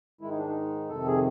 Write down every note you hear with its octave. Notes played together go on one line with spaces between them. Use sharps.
G#2 D#3 G#3 E4
D#4
D4
D#4
F2 C3 D#3 A4
G#4